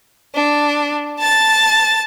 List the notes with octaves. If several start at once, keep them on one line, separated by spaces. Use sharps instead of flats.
D4
A5 A6